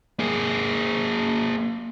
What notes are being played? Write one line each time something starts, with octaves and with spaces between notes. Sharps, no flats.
A#3 G#4